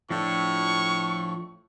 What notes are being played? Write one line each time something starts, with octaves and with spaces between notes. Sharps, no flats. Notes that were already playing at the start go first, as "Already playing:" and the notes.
A2 F3 D4 A4 C#6